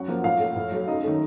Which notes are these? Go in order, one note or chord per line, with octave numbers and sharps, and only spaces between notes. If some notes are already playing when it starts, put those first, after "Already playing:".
Already playing: F#2 F#4 F#5
F3 A#3
A2 F4 F5
A3
A2
F#3 A3
F#2 D#4 D#5
D#3 A3